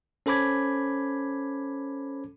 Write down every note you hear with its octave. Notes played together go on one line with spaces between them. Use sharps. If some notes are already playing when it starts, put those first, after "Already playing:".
C#4 A4 C5 B5 D6 G#6